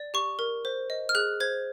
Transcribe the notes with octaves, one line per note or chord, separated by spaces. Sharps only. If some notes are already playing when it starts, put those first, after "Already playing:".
Already playing: D5
G4 C#6
A#4
C5
D#5
F6
G#4 F#6
C5 G#6